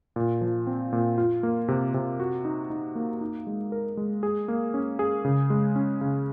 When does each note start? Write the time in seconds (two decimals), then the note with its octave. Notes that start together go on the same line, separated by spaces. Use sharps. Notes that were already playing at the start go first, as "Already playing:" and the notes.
0.16 A#2
0.41 F3
0.67 C4
0.93 A#2
1.18 F4
1.43 A#3
1.68 C3
1.94 C3
2.20 F#4
2.45 D#4
2.70 D#4
2.95 A#3
3.21 D#4
3.47 G#3
3.72 A#4
3.97 G#3
4.23 G#4
4.48 A#3
4.74 C#4
4.99 G#4
5.25 C#3
5.50 G#3
5.76 C#4
6.01 C#3